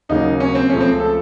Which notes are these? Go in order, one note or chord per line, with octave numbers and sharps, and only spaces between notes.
D#2 C#3 F#3 A#3 D#4
C#4
C4
C#2 C#3 F3 A3 C#4
C4
A4